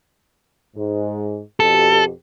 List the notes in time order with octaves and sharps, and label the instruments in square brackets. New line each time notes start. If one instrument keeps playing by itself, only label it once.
[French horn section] G#2
[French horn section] F2 B2 G4 [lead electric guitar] A4